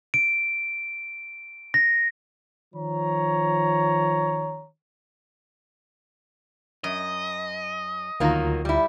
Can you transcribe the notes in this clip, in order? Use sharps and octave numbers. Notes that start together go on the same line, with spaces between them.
D7
A#6
D#3 F3 C#5 A#5
F#2 D#5
D2 D#3 F#3 A#3 F4 A#5
G3 E4